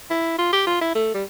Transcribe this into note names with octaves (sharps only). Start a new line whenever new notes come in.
E4
F4
G4
F4
E4
A3
G3